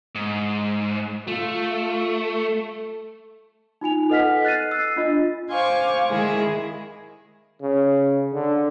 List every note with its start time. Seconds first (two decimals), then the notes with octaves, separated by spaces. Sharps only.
0.15 G#2
1.28 A3 F4
2.22 A4
3.81 D#4 F4 G#5 F7
4.10 A4 B4 D#5 F#5 F6 B6
4.45 F#6 A6 C7 D#7
4.71 E6 C7
4.96 D4 F4 D#5
5.51 C5 F5 G#5 C#6 D6
6.09 D#3 G#3 E4 G#4
7.61 C#3
8.34 D3